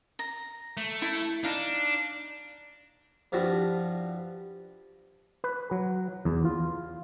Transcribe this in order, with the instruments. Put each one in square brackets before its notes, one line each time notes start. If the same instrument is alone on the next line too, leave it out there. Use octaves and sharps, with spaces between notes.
[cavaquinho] A#5
[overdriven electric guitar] A3
[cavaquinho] E4 B5
[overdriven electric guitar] D4 [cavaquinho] D#4 F5
[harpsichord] G2 F3 E4 F#4
[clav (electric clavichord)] B4
F#3
E2
F4